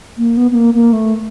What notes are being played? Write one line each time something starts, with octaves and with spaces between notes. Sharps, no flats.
A#3
B3
B3
A#3
A#3
A3